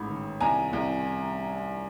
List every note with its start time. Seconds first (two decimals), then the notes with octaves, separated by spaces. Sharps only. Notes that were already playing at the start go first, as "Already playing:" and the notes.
Already playing: A1 G#2 B5
0.09 D#3
0.41 C2 G#5 A#5
0.73 C2